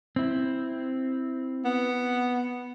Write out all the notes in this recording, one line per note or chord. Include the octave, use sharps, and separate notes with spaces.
C4 E4
B3